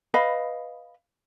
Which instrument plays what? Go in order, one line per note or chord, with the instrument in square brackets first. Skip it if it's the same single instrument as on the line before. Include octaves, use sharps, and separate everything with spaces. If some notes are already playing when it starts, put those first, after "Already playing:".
[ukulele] B4 D#5 F5 B5